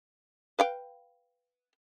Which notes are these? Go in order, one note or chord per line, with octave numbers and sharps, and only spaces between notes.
B4 F5 G5